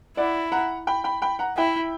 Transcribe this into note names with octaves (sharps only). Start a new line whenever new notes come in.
E4 D5 F#5
F#5 A#5
G5 B5
G5 B5
G5 B5
F#5 A#5
E4 E5 G5